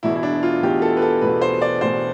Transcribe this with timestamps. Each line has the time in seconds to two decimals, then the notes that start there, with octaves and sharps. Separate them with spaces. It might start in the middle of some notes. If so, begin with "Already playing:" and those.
0.03 E1 E2 B2 E4
0.16 E4
0.23 D4
0.43 F4
0.62 E1 E2 B2 G4
0.82 A4
0.97 B4
1.02 A4
1.21 E1 E2 B2 B4
1.42 C5
1.62 D5
1.81 E1 E2 B2 C5